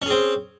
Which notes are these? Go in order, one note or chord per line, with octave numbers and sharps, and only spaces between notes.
C4 C#4 G#4